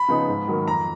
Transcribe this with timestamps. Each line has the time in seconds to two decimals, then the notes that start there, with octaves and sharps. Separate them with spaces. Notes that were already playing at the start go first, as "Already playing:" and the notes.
Already playing: B5
0.09 C#3 F3 B3 D#4
0.28 G#2
0.48 D#3 F#3 A#3
0.67 F2 A#5